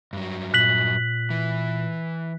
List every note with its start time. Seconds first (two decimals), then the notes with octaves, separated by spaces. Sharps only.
0.13 G2 F#3
0.54 A#2 F#6 B6 F#7
1.30 E3